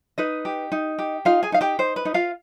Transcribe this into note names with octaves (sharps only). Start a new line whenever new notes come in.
D#4 B4 D#5
G4
D#4
G4
D#4 F4 F5
G#4 G#5
D#4 F5
G4 G5
D#4 C5
B4
D#4
F4 F5